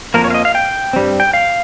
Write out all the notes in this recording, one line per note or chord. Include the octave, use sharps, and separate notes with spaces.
F2 C3 F3 A#3 A#4
C#5
F5
D#5
F5
G5
G2 G3 C4
G5
F5